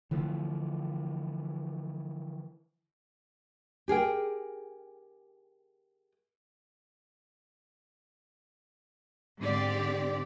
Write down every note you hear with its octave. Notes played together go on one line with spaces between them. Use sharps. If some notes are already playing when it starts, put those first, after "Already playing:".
D3 E3 F3 A3
G4 G#4 A#4 G5
G#2 D3 C4 G4 D5